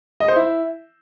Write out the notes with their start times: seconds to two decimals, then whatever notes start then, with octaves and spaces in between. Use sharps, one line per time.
0.20 D#5
0.28 C5
0.36 E4